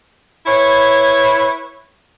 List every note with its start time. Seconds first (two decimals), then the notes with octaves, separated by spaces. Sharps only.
0.47 E4 B4 C#5